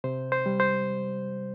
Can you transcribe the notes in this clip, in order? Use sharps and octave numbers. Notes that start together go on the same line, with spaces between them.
C3 C5
C5
G3
C5